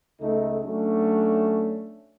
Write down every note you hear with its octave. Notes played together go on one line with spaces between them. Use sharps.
C#2 A3 D#4 A4
F#3 A3 C#4 D4